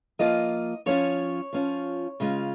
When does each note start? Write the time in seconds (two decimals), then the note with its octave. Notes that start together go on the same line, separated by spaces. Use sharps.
0.19 F3 A#3 F4 D#5
0.86 F3 C#4 F4 C#5
1.53 F3 C#4 F4
2.20 C#3 G#3 F4